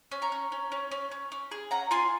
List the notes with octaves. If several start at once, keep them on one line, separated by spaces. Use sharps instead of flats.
C#4
A#5 C#6
C#4
C#4
C#4
C#4
C#4
C#4
G#4
C#4 F#5 A#5
F4 G#5 C6